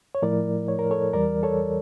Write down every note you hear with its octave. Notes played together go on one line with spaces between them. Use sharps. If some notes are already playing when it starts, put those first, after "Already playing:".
C#5
A2 F3 A3 E4 A#4 D5
C#5
A#4
A4 C#5
E2 E3 G3 A#4 D5
A4 C#5